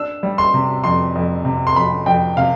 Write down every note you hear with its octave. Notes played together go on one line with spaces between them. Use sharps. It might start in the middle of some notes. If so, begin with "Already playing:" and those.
Already playing: D4 E6
G3
C6
C3
F2 C6
F2
C3
C6
F2 B5
F2 G5
C3 F5